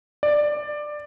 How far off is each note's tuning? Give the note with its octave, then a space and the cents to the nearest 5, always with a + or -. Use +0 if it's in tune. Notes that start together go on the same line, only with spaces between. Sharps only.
D5 +15